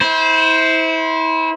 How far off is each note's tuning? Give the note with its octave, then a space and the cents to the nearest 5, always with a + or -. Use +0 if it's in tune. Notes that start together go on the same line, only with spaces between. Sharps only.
E4 -30 C5 +0